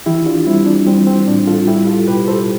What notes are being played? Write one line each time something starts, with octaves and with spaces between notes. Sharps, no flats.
E3 E4 G4
D4 F4
G3 C4 E4
D4
G3 C4
C4
A2 D4
F4 A4
G3 E4 G4
F4 A4
B2 G4 B4
A4 C5